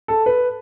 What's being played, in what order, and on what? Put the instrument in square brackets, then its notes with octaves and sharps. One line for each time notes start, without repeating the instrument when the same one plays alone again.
[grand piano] A4
B4